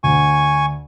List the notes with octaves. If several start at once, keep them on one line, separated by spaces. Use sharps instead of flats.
D2 G#5 C#6